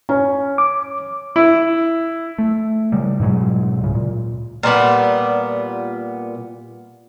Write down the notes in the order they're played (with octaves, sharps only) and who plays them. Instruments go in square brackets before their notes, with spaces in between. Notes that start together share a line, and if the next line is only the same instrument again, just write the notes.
[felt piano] C#4
[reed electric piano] D6
[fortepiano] E4
[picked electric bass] A3
C#3 G3
G#2 B2 F#3 G#3
D1 C#3
A#2
[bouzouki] A#2 G3 B3 B4